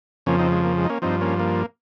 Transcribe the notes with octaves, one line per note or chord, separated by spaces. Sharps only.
F2 C#3 F3 A#3 C#4
C4 D#4
G#3
A#3
G#3
D#4
A#3 C#4
G2 F3 C4 D#4
A#3 C#4
A#3